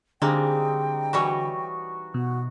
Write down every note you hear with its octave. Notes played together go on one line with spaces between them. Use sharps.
D3 G3 G#3 A#3 C4 D#4 G5
E3 G3 F#4 C#5 C#6
B2 F#4